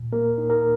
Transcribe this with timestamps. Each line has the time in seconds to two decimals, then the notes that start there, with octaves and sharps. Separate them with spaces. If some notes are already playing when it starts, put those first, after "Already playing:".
Already playing: A#2
0.12 A#3 A#4
0.38 D#4
0.50 A#4